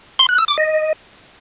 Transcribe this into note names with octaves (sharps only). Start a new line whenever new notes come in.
C6
F#6
E6
D6
D#5